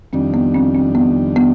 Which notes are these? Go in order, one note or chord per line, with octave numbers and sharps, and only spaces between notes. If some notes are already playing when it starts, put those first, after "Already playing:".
F2 D#3 G3 C4 D4
B3
C4
C4
B3
B3